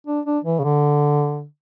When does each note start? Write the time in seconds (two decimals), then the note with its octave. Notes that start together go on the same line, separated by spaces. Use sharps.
0.07 D4
0.25 D4
0.45 E3
0.60 C#3
0.64 D3